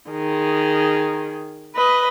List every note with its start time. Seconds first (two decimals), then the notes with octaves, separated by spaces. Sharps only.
0.10 D#3 G#4
1.75 B4 D#5